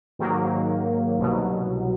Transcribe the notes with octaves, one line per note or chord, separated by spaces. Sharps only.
G#2 D#3 F#3 A#3
C2 B2 F#3